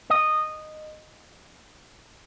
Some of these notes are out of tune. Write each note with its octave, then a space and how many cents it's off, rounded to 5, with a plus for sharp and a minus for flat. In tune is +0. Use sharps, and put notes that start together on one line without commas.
D#5 -10